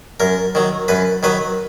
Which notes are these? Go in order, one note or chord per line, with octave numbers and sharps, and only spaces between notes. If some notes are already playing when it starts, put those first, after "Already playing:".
F#2 A#4
D#3 F#3
F#2 B4
D#3 F#3 B4